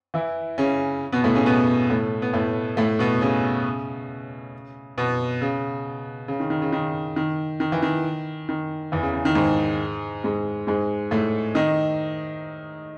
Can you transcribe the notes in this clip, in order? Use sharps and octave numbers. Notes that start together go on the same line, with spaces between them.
E3 E4
C#3 C#4
B2 B3
A2 A3
C#3 C#4
B2 B3
A2 A3
B3
A2 A3
A2 A3
B2 B3
C#3 C#4
B2 B3
C#3
C#3
D#3
D#3
C#3
D#3
D#3
D#3
E3
D#3
D#3
E2 E3
C#3
C#3
D#3
G#2 G#3
G#2 G#3
G#2 G#3
A2 A3
D#3 D#4